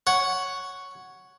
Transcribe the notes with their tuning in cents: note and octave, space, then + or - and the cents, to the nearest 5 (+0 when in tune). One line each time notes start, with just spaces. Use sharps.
C#5 +0 F#5 +0